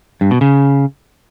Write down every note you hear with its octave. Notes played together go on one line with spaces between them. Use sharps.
G2
B2
C#3